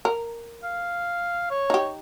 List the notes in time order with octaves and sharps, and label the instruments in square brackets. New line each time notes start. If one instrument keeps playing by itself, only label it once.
[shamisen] A#4
[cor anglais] F5
C#5
[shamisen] D#4 G4